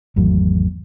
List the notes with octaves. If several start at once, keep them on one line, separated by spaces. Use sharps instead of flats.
G#1 E2 F#3 A3